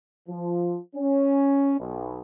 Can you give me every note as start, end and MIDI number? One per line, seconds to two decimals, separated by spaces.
0.29 0.79 53
0.96 1.75 61
1.80 2.21 35